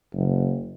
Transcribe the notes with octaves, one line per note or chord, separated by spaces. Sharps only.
F#1